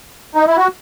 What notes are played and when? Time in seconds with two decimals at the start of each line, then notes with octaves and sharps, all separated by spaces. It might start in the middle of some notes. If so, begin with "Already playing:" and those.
0.35 D#4
0.46 E4
0.57 F#4